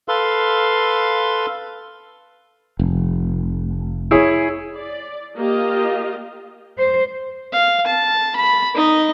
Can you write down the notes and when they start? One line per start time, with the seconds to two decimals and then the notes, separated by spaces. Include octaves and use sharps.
0.08 A4 B4 F5 C6
2.79 F1
4.11 E4 G#4 C#5
4.76 D5
5.37 A#3 F4 G4 D#5 F5
6.78 C5
7.53 F5
7.86 A5
8.36 B5
8.75 D#4 D#5